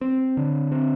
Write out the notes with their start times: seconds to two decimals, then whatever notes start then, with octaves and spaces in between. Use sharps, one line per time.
0.01 C4
0.37 D3
0.72 C4